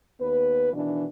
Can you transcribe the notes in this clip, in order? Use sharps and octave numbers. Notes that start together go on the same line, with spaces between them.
D#2 B3 B4
B2 D#3 E3 D4